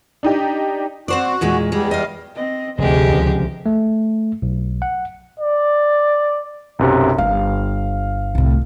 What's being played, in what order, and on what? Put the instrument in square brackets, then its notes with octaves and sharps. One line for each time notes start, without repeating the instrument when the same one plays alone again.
[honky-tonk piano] D4 D#4 G4
[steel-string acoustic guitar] C4 C5 D5 [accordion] F#4
[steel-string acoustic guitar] E2 A#2 G#3
[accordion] E2 G3 [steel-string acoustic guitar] G#3
[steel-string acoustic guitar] D#5 F5
[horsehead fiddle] C4 D#5
[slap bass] F1 [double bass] D2 C3 [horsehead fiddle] G#3 D#5 [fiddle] G4 G#4
[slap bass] C#2 F3
[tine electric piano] A3
B1
F#5
[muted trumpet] D5
[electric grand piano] B1 F#2 C3
[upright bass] G1 [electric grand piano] F5
[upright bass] C2 A2